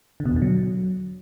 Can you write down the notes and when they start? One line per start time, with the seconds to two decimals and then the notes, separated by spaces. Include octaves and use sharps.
0.20 D3
0.25 B2
0.31 E2
0.36 D3
0.42 F#3